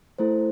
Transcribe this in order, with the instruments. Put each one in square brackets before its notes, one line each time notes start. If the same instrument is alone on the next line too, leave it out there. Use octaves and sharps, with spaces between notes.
[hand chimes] A3 E4 A4 C5